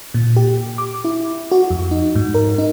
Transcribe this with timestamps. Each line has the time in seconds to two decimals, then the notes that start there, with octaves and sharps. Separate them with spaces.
0.14 A#2
0.36 G4
0.78 D6
1.04 E4
1.51 F#4
1.70 F2
1.91 D#4
2.15 G#2
2.35 A#4
2.58 D#4